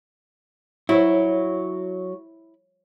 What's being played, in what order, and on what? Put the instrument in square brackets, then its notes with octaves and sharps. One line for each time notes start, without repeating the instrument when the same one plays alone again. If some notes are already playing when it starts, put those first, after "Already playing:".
[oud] F#3 [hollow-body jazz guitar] E4